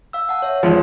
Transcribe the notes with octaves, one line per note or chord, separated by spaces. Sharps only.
F5 E6
F#5 A5
C#5 E5
G#1 F3